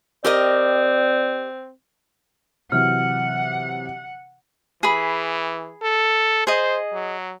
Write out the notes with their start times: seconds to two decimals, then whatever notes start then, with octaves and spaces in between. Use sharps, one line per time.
0.25 C4 G4 A#4 D5 D#5
2.72 C3 E3 F#3 F#5 F6
4.83 E3 G#4 B5
5.82 A4
6.47 G#4 C5 D#5
6.93 F#3